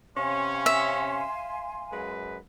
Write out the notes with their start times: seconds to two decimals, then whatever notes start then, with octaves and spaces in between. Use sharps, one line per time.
0.17 C3 C#4 F5 G#5 C6
0.66 E5
1.92 F#2 G#3 B4